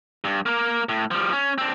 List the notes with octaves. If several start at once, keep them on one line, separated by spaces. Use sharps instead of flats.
G2
A#3 A#4
A2
F3 G3
C#4
C4 D4